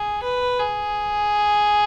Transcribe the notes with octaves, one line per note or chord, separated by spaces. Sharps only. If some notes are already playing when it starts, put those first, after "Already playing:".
Already playing: G#4
B4
G#4